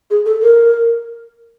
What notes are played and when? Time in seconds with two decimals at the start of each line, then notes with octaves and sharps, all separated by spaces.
0.10 G#4
0.25 A4
0.42 A#4